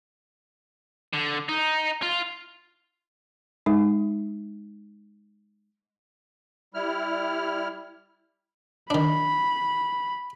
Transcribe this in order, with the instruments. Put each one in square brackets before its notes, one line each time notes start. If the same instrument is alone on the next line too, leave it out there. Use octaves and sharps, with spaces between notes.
[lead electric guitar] D3
D#4
F4
[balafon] G#3 D#4
[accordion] G3 E4 F6
[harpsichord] D#3 D4 [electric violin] B5